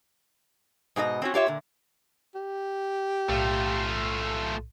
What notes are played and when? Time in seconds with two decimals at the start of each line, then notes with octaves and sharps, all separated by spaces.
0.96 G#2 B2 G4 D#5
1.22 C4 C#4 F#4
1.34 F4 G4 C#5 E5
1.46 A#2 D3
2.35 G4
3.29 B1 A2 A3 F4